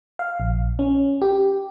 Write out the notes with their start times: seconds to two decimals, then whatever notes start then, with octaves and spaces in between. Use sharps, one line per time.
0.19 F5
0.40 A#1
0.79 C#4
1.22 G4